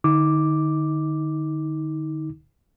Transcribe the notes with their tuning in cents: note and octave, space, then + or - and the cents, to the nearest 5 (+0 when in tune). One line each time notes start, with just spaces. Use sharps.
D3 +40 D#4 +30 D6 +0